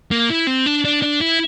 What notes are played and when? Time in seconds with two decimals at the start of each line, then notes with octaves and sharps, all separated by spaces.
0.11 A#3
0.30 E4
0.47 C4
0.66 D4
0.85 D4
1.02 D4
1.21 E4